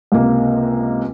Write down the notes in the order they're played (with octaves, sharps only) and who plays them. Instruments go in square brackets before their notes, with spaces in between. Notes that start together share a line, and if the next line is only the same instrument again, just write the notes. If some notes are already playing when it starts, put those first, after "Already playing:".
[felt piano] C#2 C3 A#3